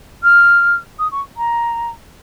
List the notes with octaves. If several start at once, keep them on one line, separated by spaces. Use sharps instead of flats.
F6
D#6
C#6
A#5